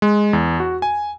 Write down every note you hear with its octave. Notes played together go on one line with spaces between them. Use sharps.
G#3
E2
F#4
G#5